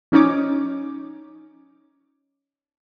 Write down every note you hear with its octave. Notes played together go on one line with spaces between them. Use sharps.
F3 C#4 D#4 C#5 D6